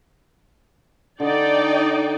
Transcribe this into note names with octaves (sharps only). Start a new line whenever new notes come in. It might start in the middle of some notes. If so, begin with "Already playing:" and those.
D3 D#4 D5 G5